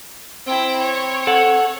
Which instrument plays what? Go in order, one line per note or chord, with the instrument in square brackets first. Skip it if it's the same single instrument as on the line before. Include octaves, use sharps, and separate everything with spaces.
[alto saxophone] C4 [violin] E4 G5
[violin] C#5
[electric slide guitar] A4 F#5